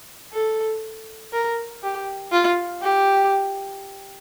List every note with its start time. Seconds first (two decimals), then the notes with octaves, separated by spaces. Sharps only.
0.33 A4
1.33 A#4
1.83 G4
2.32 F4
2.82 G4